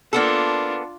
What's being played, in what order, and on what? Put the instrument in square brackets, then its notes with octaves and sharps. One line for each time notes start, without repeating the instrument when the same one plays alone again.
[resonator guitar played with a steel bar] A#3 B3 A4 [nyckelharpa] D4 F4